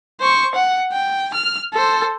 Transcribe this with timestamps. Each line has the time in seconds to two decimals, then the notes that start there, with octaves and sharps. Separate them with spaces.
0.21 C5 C#6
0.55 F#5
0.93 G5
1.34 F6
1.74 A4 C5